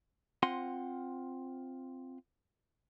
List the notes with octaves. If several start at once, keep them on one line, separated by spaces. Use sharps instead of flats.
C4 F4 F#5 C6